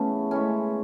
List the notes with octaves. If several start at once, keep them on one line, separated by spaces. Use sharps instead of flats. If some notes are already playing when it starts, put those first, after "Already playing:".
Already playing: C#3 E3 A3 B3 C#4
A2 E3 G#3 C#4